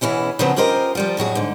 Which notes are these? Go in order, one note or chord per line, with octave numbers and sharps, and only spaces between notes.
B2 E3 C#4 E4 G#4
C#3 F3 F#3 B3 C4
C#4 F4 G4 A#4 C5 D#5
F3 G3 F4
F2 A2 F#3 G#4
G#2 D3